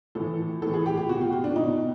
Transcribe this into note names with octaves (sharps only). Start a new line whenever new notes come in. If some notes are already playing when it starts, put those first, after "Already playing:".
A2 E3 A4
A2 E3 A4
G#4
G4
G4
B2 F#4
F4
F4
D4
B2 D#4